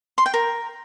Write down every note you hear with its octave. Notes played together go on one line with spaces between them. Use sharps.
C6
G5
A#4